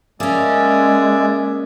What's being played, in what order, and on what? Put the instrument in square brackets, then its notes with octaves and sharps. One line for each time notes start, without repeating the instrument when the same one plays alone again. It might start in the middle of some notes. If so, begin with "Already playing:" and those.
[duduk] G#3 [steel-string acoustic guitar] A#3 C#4 [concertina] G#4 D5 E5